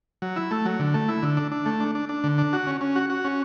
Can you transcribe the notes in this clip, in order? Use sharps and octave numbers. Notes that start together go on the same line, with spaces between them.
F#3
E4
A3
F#3
D3
A3
E4
D3
D4
D4
A3
D4
D4
D4
D3
D4
F#4
C#4
C#4
F#4
F#4
C#4